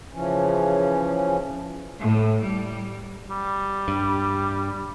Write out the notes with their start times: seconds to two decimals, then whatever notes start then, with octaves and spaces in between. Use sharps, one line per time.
0.13 C#3 E3 F3 C#4
2.01 A2
2.42 G3
3.30 G3
3.88 G2